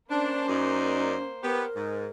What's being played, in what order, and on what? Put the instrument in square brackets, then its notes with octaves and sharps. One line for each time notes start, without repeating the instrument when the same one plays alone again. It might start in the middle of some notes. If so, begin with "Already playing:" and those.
[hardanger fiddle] A#3 C5 [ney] C#4 [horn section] D4
[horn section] F#2 D#4 D5
[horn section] B3 G4 [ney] A#4
[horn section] G#2